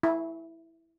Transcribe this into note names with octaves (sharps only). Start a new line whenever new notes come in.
E4